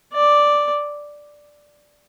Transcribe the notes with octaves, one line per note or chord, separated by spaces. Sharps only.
D5